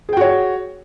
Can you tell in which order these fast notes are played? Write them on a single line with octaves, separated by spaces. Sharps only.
G#4 G5 F#4 C#5